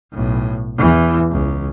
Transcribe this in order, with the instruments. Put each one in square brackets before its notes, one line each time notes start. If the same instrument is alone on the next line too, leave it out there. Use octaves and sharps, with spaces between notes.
[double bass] B1 A2
E2 E3
C#2